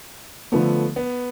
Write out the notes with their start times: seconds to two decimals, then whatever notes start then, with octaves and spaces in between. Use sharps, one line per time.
0.52 D3 F3 A3 B3
0.96 B3